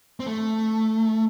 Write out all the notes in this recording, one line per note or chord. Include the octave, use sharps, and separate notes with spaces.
C4
A3